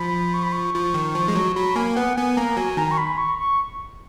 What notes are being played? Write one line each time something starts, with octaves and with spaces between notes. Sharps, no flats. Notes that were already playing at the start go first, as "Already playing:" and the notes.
Already playing: F3 B5
C#6
B5
C#6
F3
D#3
F3
G#3
F#3
F#3 B5
A#3 G#5
B3 F#5
B3 G#5
A#3 A#5
F#3 G#5
D#3 A#5
C#6
B5
C#6
C#6